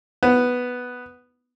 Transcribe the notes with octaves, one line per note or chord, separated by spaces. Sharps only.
B3